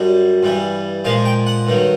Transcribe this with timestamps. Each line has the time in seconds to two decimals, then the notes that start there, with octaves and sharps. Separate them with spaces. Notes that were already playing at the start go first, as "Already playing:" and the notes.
Already playing: F#2 D3 G3
0.43 G2 E3 G3
1.05 A#2 F3 G#3 F5
1.26 G5
1.46 F#5
1.67 G2 D#3 F#3